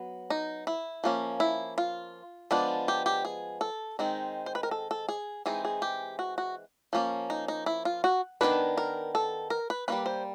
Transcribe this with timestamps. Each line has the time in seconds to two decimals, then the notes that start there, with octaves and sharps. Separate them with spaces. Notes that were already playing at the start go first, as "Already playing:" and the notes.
Already playing: F#3 B3
0.30 D#4
0.67 E4
1.04 F3 A#3 C#4
1.40 E4
1.78 F4
2.51 F3 G#3 B3 D4
2.88 G4
3.06 G4
3.25 G#4
3.61 A4
3.99 D#3 G#3 C4 D#4
4.46 C5
4.55 B4
4.63 A#4
4.71 A4
4.91 A4
5.09 G#4
5.46 E3 G#3 C4 D#4 G#4
5.65 G#4
5.82 G4
6.19 F#4
6.38 F#4
6.93 F3 A#3 C#4
7.30 D#4
7.48 D#4
7.66 E4
7.85 F4
8.04 F#4
8.41 D#3 G#3 B3 D4 B4
8.78 A#4
9.15 A4
9.50 A#4
9.70 B4
9.88 G3 A#3 C#4 B4
10.06 C5